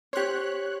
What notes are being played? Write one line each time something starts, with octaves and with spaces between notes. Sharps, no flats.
G4 C5 C#5 F#6